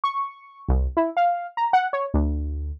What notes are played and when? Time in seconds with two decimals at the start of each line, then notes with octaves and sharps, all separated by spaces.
0.04 C#6
0.68 C2
0.97 E4
1.17 F5
1.57 A#5
1.73 F#5
1.93 C#5
2.14 D2